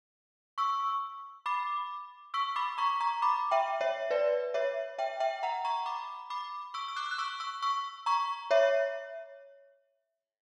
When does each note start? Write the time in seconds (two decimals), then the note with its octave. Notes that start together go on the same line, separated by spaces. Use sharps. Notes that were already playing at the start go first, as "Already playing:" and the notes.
0.58 C#6 E6
1.46 B5 D6
2.34 C#6 E6
2.56 B5 D6
2.78 A#5 C#6
3.00 A#5 C#6
3.22 B5 D6
3.51 E5 G5
3.81 C#5 E5
4.11 B4 D5
4.54 C#5 E5
4.98 E5 G5
5.20 E5 G5
5.43 F#5 A#5
5.65 A#5 C#6
5.86 B5 D6
6.30 B5 D6
6.74 C#6 E6
6.88 E6
6.96 D6 F#6
7.11 F#6
7.18 C#6 E6
7.40 C#6 E6
7.62 C#6 E6
8.06 A#5 C#6
8.51 C#5 E5